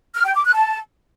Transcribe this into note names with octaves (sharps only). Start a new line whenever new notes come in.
F6
G5
D6
F#6
A5